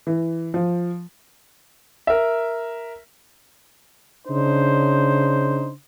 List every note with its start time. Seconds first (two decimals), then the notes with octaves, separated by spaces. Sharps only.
0.07 E3
0.54 F3
2.07 A#4 E5
4.27 C#3 D4 D#4 C5